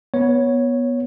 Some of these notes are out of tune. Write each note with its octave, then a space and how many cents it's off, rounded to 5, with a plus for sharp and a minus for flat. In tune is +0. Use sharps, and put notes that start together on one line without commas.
B3 -15 C#5 +0